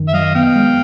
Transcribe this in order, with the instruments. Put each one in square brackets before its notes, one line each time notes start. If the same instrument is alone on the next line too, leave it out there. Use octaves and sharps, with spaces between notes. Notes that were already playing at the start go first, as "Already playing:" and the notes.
Already playing: [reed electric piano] F#2 D#3
[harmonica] E5
[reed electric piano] F#3 [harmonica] D#5 F5
[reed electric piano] B3 [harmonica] F5 G5
[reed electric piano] G#3